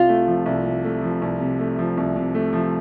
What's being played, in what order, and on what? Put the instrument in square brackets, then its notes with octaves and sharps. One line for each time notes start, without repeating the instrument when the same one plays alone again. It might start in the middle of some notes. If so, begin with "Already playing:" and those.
Already playing: [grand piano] C2 C3 [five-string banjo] F4
[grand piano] A3
F3
C2
C3
A3
F3
C2
C3
A3
F3
C2
C3
A3
F3